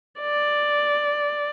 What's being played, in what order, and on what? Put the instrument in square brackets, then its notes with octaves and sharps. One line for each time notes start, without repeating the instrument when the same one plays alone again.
[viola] D5